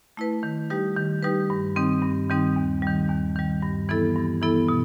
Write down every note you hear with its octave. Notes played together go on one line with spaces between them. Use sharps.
A3 E4 B4
D#3
G3 D#4 G4 B4
D#3
G3 D#4 G4 B4
G2
D#3 G3 C4 D#4
G2
D#3 G3 C4 D#4
D#2
D#3 G3
D#2
D#3 G3
G2
E3 B3 E4 A4
G2
E3 B3 E4 A4
B2